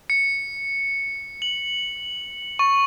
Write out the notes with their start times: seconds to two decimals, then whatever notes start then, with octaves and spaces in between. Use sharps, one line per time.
0.10 C#7
1.42 F#7
2.59 C#6